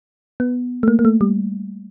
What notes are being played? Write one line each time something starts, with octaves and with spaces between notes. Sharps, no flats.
B3
A3
A#3
A#3
A3
G3